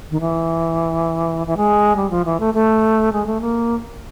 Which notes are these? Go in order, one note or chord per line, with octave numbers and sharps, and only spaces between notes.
D#3
E3
E3
G#3
G3
F3
E3
A3
A3
G#3
A3
A#3